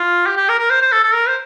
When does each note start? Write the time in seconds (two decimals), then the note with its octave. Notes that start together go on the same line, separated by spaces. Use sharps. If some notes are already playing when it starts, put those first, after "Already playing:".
Already playing: F4
0.27 G4
0.37 G4
0.49 A#4
0.59 A#4
0.70 C5
0.82 C5
0.92 A4
1.03 A4
1.14 A#4
1.28 C5